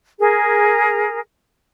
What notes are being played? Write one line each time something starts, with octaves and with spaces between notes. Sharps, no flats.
G#4 A#4